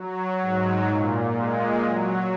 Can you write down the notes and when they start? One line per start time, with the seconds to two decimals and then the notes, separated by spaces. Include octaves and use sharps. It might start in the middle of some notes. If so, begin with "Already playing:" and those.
Already playing: F#3
0.41 G#2
0.88 A#2
1.36 G#3
1.83 F#3